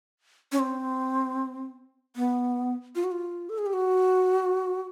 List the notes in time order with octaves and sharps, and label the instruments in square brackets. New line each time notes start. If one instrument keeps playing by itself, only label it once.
[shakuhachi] C#4
C4
B3
F4
F#4
F4
A4
G#4
G4
F#4